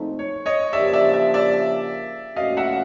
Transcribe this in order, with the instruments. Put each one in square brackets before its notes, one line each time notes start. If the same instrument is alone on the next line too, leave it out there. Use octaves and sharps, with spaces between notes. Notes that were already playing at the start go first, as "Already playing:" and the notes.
Already playing: [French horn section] A#2 F3 A3 C4 D#4
[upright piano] C#5
C#5 D#5
[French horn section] C#3 F3 A#3 D4 G4 [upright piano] D5 E5
[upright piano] D5 E5
D5 E5
D5 E5
[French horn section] A#2 F3 A3 C#4 F#4 [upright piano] D#5 F5
[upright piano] E5 F#5